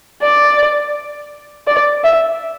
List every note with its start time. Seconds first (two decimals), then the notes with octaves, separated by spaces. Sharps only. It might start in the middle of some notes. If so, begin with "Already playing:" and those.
0.22 D5
1.67 D5
2.04 E5